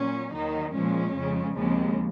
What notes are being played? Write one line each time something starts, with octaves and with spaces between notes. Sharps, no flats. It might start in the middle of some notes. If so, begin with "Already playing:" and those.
Already playing: A#2 F#3 C#4
D#2 D#3 F#3 D#4
A#2 F3 G#3 C#4
F2 C#3 G#3
D#2 C#3 F3 G#3 C4